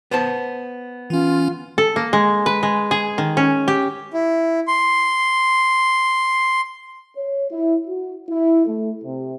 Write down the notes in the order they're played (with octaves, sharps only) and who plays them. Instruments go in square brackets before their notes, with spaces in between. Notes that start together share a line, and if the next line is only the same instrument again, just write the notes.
[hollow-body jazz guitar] B3 C5 A5
[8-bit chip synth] E3 C#4 [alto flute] F4
[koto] A4
A#3
G#3
B4
G#3
G#4
D#3
C#4
G4
[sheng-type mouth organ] E4
C6
[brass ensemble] C#5
E4
F#4
E4
A3
C3